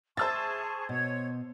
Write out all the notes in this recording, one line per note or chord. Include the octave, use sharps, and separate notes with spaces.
G#4 C5 E5 A5 C#6 E6 A6
B2 C#5 G#6